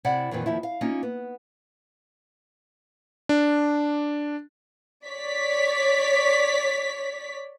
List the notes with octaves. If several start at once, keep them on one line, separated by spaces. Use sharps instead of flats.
C3 E4 D5 F#5
F2 A#2 D#3 E3
D#2 F3 E4
F5
A#3 C#4 D#4 F4
B3
D4
C#5 D5 B6